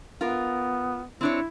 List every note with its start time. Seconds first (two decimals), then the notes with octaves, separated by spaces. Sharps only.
0.21 B3 F4 A#4
1.21 C4 D4 E4 C#5